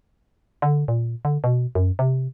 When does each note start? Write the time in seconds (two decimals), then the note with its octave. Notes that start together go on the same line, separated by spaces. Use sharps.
0.62 D3
0.88 A#2
1.25 D3
1.44 B2
1.75 F#2
1.99 C3